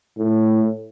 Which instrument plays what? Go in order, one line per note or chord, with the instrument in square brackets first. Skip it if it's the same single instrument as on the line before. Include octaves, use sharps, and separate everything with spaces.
[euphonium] A2